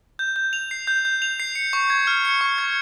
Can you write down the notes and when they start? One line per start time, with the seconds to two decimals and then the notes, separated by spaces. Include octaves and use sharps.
0.19 G6
0.36 G6
0.53 F7
0.71 C7
0.87 G6
1.05 G6
1.22 F7
1.40 C7
1.55 C#7
1.73 C#6
1.90 G#6
2.07 F6
2.25 C#7
2.41 C#6
2.58 G#6